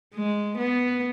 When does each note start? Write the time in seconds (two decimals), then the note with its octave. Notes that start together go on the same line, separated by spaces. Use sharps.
0.15 G#3
0.58 B3